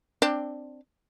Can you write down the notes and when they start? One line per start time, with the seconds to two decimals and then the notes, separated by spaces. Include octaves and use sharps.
0.22 C4 D4